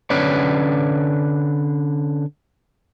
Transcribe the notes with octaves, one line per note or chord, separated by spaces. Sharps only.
D3 C#4 B4 C#5 D5